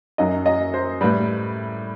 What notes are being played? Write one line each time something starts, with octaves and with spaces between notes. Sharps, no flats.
F#2 F#3 D#5
D#5
C5
A2 G3 B4